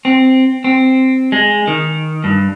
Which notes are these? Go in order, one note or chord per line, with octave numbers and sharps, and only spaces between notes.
C4
C4
G#3
D#3
G2